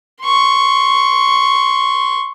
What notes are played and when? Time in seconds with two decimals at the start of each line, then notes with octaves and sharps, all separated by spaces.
0.23 C6 C#6